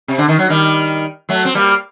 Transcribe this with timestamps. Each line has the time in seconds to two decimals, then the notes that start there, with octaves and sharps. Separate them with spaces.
0.08 C3
0.18 D3
0.28 D#3
0.39 F#3
0.49 D#3 G3
1.29 F#3 A3
1.45 C4
1.55 G3 A#3